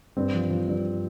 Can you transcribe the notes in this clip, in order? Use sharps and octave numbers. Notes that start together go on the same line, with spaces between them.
G2 C4
F3
F3
G2